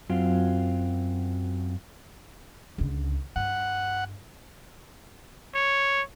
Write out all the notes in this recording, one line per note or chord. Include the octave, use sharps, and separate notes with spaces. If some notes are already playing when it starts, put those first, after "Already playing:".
F#2 F#3 C4 F4
C#2 D3
G2 F#5
C#5